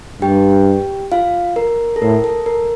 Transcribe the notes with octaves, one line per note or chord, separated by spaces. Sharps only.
G2 G4 G5
F4 F5
A#4
A4
A2 A#4
A4
A#4